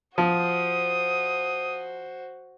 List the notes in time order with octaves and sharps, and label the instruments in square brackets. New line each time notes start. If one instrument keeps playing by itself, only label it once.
[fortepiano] F3 [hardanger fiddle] F#4 C5 [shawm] D#6